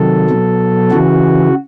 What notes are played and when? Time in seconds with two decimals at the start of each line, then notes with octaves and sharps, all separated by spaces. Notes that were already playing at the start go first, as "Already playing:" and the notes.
Already playing: C3 D#3 F#3 A4
0.30 B2 F#3
0.91 C#3 E3 F#4